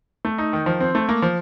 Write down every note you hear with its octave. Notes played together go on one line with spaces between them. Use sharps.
A3
D#4
D#3
F3
C4
A3
A#3
F3